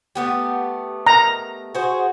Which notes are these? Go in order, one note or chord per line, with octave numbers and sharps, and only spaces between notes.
A3 B3 G4
A#5
F#4 G#4 C5